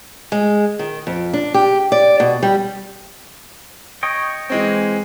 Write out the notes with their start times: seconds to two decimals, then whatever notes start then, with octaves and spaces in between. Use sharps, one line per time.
0.32 G#3
0.79 D#3
1.07 F2
1.33 D4
1.54 G4
1.92 D5
2.20 B2
2.43 G3
4.03 C#5 D#5 G5
4.50 E3 G#3 C4